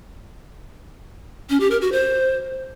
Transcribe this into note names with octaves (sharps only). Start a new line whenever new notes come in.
C#4
G4
A#4
F#4
C5